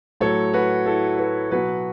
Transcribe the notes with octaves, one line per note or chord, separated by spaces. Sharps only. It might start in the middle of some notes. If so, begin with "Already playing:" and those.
A2 F#3 A4 C#5
F#4 B4
E4 A4
F#4 B4
B2 F#3 F#4 B4